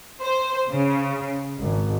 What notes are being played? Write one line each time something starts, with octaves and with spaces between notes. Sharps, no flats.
C5
C#3
G#1